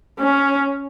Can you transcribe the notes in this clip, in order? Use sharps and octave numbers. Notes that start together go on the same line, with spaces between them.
C#4